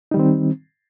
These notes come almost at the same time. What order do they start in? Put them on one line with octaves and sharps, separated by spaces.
D#4 G3 D#3 C4